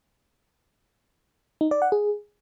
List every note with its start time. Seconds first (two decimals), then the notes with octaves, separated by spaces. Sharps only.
1.61 D#4
1.71 D5
1.82 F#5
1.92 G#4